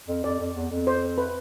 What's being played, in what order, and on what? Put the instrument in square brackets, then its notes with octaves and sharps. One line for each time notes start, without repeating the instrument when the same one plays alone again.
[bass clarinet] F2
[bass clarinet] F2 [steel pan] D5
[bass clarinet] F2
E2
F2
[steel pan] C5
B4